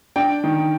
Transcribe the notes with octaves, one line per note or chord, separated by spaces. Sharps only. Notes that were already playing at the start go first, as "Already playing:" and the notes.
D4 G5
D#3